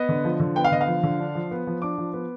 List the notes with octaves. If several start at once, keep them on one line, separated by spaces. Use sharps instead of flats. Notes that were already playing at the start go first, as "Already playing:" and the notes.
Already playing: B3 D#5
D3
F3
D3
B3 G5
F5
D3 D#5
F5
F3
D3
D4
F3
B3
F3
D4 D6
F3
B3